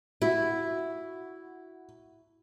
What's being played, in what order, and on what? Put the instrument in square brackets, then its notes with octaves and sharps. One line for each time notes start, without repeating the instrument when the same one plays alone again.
[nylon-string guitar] E4 [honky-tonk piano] F#4